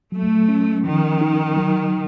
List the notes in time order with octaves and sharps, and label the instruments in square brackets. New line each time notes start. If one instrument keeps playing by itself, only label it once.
[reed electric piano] F#3 [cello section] A3
[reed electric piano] C#4
[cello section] D#3 [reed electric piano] F3
[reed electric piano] D#4
F#3